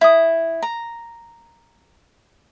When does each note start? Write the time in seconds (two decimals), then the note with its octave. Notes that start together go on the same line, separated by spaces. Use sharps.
0.01 E4 D#6
0.63 A#5